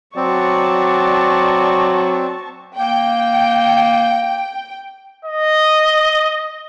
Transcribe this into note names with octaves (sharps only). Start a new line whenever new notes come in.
F#3 C4 D5 A5 C#6
A#3 G5
D#5